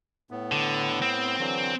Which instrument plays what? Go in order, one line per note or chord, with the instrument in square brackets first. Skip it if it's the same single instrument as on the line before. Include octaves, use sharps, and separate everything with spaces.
[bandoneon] A2 B3
[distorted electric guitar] D3
C4
[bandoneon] D3 E3 F#3